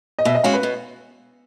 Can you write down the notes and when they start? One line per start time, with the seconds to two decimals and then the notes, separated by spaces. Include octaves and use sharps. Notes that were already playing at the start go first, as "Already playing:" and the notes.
0.19 D#5
0.25 B2 E5
0.35 D#5
0.44 G#3 C#4 F#4 F5
0.54 B4
0.63 B2